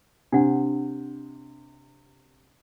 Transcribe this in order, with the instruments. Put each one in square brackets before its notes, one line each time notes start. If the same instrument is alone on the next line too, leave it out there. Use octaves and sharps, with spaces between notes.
[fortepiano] C3 [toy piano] D4 F#5